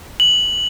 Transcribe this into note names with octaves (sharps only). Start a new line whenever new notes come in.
F#7